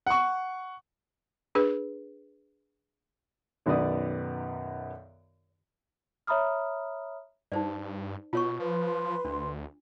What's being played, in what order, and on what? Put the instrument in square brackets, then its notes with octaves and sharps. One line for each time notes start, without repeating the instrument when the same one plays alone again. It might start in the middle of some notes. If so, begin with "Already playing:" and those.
[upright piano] F#5 C#6
[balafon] D4 G#4 B4
[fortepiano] B1 F#2 D#3 B3 D5 D#6
[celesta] C#5 E5 A#5 B5 D#6 F6
[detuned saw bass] G2 [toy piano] D#4 C5 D5
[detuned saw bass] B2 [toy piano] F4 C#5 C#6
[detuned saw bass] F3 [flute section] B4 C6
[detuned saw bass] D2 [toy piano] D4